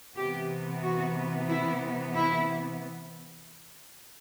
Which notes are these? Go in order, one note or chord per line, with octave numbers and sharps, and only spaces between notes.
C3 E3 B3 G4
F#4
E4
E4